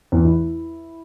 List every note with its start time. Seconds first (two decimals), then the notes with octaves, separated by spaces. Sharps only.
0.12 E2
0.24 E4